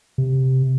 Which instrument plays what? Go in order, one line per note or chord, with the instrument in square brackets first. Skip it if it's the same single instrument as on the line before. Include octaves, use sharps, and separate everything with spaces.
[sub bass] C3